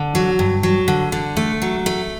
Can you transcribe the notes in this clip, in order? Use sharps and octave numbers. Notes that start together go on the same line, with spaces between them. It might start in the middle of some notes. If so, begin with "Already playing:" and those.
Already playing: D3
F#3
G2
F#3
D3
D3
A3
F#3
A3